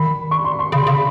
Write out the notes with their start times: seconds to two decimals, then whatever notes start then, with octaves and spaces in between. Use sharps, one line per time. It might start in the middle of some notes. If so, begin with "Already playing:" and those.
Already playing: D#3 B5
0.31 C#6
0.44 C6
0.59 C6
0.72 C#3 B5
0.83 C#3 C6
0.93 B5